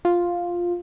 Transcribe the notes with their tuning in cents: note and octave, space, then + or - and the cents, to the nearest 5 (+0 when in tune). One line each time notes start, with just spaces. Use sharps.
F4 +5